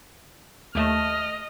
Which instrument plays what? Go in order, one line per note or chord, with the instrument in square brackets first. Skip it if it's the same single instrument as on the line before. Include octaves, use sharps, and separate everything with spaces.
[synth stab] D#2 A3 A5 [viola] D#5 [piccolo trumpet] F6